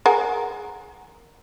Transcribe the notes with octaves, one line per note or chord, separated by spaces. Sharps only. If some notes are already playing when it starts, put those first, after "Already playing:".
G#4 A#4 F#5